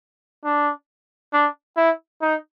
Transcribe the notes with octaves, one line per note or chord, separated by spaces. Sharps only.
D4
D4
E4
D#4